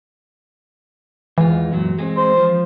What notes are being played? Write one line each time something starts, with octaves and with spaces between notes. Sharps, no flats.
E2 E3 G#3 F4
F#2 A#2 F#3
G#3 A#3 C4
C5
F3